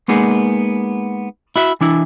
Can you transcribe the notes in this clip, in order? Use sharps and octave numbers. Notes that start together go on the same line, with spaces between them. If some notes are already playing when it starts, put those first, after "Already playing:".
G#3 A#3 B3 D#4 G#4
E4 F#4 E5
E3 D4 E4